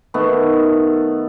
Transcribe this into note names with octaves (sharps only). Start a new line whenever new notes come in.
D#3 A3 B3